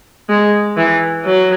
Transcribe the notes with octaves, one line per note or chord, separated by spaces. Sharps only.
G#3
E3
F#3